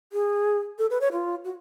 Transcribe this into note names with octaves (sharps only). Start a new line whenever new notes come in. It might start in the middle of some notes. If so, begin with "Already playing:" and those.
G#4
A4
B4
C#5
F4
F#4